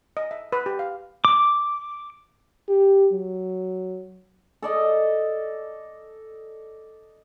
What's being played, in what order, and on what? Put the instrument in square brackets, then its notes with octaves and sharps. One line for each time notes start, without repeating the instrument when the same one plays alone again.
[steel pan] D#5
E5
B4
G4
F5
[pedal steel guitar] D6
[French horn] G4
F#3
[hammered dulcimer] A4 D5 D#5